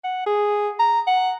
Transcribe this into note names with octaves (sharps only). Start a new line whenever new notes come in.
F#5
G#4
A#5
F#5